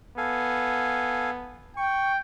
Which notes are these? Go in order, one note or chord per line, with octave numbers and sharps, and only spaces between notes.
B3 A4 F5 G#5
G5 C#6